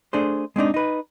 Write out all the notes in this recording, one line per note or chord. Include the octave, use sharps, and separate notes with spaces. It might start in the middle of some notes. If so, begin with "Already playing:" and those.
A3 D4 G#4 C5
G#3 C4 D4 D#4
D#4 B4